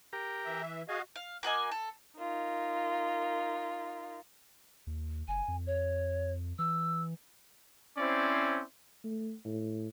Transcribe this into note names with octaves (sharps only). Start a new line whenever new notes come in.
G4 A#4
E3 E5
F#4 G#4 D#5 F5
F5
A#3 F#4 D#5 G#5
A4
D#4 F4 A#4
D#2
F#1 G#5
F2
C#5
E3 E6
C4 C#4 E4 C5 D5
A3
A2